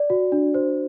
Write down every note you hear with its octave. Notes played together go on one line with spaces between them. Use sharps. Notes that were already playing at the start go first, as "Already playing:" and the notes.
Already playing: D5
F#4
D4
C5